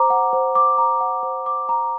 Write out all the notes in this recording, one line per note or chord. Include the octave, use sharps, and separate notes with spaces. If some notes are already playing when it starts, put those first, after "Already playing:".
Already playing: C5 A#5 D6
F#5
C5
D6
A#5
F#5
C5
D6
A#5